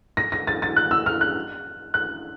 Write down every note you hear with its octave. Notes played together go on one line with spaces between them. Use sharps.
A#6
A#6
A6
A6
F#6
E6
F6
F#6
F#6